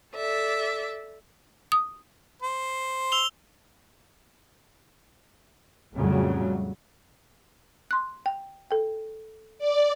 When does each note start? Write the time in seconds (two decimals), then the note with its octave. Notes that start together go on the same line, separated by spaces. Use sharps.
0.14 A4 D5 E5
1.72 D#6
2.42 C5
3.12 E6 F7 G7
5.94 F2 A2 C#3 F#3 G3 A3
7.91 C6 F#6
8.26 G5
8.71 A4 G5
9.58 D5